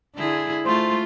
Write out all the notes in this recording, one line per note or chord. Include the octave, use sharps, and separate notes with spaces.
D3 E4 G#4
A3 F4 C5